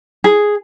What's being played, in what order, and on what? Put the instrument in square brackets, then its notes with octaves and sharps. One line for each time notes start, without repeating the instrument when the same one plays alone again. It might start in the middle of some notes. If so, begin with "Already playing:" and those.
[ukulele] G#4